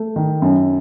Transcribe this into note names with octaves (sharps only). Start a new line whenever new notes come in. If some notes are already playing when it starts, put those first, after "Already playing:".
Already playing: A3
D#3
F#2